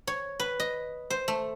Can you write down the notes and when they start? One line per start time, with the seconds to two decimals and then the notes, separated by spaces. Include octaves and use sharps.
0.07 C#5
0.40 B4
0.60 D#5
1.10 C5
1.28 A3